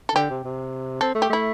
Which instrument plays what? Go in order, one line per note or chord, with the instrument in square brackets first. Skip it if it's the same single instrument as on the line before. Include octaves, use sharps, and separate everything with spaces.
[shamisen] A4
[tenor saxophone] D3 [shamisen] G4
[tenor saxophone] C3
C3
[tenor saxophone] C4 [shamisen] A4
[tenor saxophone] A3
[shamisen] G4
[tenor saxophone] A3 [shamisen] E4